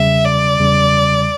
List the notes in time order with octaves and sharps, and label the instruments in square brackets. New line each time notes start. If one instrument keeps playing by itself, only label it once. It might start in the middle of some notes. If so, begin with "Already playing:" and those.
Already playing: [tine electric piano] E2 C#3 G3 [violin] E5
[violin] D5
[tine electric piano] E2 C#3 G3